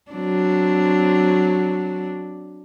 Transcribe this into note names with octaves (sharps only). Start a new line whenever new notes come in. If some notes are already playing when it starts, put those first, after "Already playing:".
F#3 C4 D4